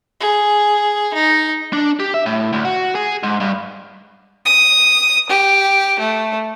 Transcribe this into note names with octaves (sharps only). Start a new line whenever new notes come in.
G#4
D#4
D4
G4
E5
A2
D2
F#4
G#4
G#2
G2
D#6
G4
A3